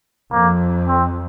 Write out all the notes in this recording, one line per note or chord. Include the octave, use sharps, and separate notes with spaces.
F2 A#3
C4